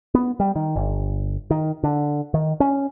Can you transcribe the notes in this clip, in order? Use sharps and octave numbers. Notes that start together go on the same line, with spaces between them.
B3
G3
D#3
G1
D#3
D3
D#3
C#4